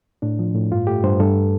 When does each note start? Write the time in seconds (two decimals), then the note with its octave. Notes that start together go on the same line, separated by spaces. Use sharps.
0.22 A2 D4
0.39 F3
0.55 A2
0.71 G2 F4
0.87 A3 G4
1.04 G2 C5
1.20 G2 A4